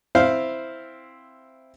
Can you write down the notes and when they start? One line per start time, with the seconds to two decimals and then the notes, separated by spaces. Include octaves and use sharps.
0.15 C4 E4 C5 F5